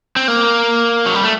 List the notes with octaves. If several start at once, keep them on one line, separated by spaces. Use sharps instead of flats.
C4
A#3
F#3
G3
A3